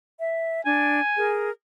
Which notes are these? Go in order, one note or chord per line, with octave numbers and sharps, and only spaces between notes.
E5
D4 G#5
G#4 A#4